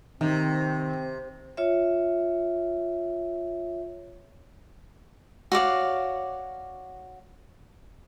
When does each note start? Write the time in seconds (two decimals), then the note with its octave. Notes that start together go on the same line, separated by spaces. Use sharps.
0.21 C3 D#3 C4
1.57 F4 C#5 E5
5.52 F#4 C#5 D5 F5